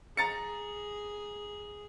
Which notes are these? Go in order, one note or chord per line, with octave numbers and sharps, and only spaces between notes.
G#4 A#5 A6 C#7